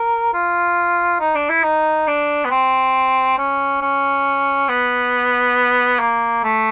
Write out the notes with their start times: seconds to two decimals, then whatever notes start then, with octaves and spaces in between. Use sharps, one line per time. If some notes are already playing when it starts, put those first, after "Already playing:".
Already playing: A#4
0.34 F4
1.20 D#4
1.35 D4
1.50 E4
1.64 D#4
2.07 D4
2.45 B3
2.51 C4
3.38 C#4
3.81 C#4
4.69 B3
5.99 A#3
6.44 A3